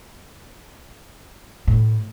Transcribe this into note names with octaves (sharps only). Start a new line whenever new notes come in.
A2